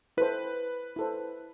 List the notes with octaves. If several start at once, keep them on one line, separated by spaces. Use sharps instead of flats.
E4 A4 B4 C5
E4 A4 C5